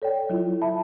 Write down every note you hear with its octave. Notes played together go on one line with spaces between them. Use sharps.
A4 C#5 D5 G5
F#3 E4 F4
E5 A5 B5